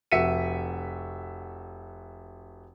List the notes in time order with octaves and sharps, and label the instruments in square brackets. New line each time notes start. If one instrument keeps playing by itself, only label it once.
[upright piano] F1 F#4 E5 B6 C#7 D#7